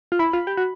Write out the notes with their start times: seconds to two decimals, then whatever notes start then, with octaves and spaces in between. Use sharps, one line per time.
0.12 F4
0.19 E4 B5
0.33 F4
0.47 G4
0.57 F#4